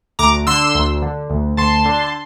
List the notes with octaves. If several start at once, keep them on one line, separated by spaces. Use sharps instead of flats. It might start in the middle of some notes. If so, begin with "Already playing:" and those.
D2 A#5 D6
D3 C6 E6
D2
D3
D2
D2 A5 C6
D3